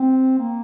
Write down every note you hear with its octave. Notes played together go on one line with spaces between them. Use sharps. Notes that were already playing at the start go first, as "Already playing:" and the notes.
Already playing: C4
A#3